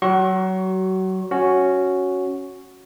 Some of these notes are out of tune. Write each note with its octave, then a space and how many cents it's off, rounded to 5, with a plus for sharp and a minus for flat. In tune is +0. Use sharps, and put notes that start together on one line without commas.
F#3 +25 F#4 +30 C#6 -35
C#4 +0 F#4 +0